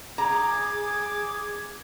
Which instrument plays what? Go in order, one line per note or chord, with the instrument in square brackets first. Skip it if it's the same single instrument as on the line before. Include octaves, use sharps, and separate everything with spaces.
[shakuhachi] G#4 [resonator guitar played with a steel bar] A#5 [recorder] D6 [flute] G#6